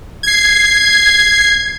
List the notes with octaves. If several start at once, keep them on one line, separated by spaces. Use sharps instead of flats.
G#6 C7